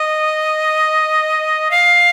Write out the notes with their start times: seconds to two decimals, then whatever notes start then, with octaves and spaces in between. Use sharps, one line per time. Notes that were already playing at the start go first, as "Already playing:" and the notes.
Already playing: D#5
1.71 F5